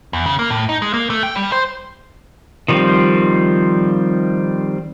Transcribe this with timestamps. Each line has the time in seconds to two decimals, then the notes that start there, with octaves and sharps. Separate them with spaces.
0.13 E2
0.26 C#3
0.39 A#3
0.51 A2
0.69 D#4
0.82 G#3
0.94 A#3
1.10 A3
1.23 G5
1.35 G3
1.52 C5
2.68 D#3 F3 G3 C4